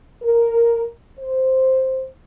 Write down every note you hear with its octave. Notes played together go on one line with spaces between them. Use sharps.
A#4
C5